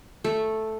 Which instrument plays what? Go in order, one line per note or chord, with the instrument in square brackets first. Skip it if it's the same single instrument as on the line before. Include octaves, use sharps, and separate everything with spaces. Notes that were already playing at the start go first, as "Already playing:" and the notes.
[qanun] A3